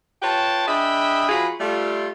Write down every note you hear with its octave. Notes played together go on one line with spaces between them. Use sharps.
F4 B4 C#5 G5 A5
D4 G#4 D#5 E5 G5 B5
F3 F4 F#4 G#4 A#5 B5
G3 A3 F4